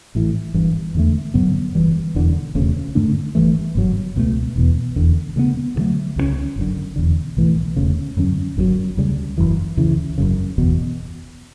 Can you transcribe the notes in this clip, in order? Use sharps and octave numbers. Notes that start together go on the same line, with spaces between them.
A1 A2 E3
G1 G2 E3
E2 D3 A3
G2 D3 F#3 B3
F#1 F#2 E3 G3
E1 E2 D3
E1 D2 C#3
G2 D3 A3 D4
G1 G2 E3 A3
G1 G2 F#3
C#2 B2 F#3 A3
E1 E2 B2
E1 E2 D3
D2 C#3 G3 B3
D2 D3 F#3 A3
C#2 C#3 G3 C#4
G1 F#2 D3
E1 E2 D3
B1 A2 E3 A3
E1 D2 C#3
F#2 D3 F#3 C#4
G1 F#2 C#3 F#3
D2 C#3 G3
F#1 F#2 E3
D2 C#3 E3
F#1 F#2 C#3
F#1 E2 B2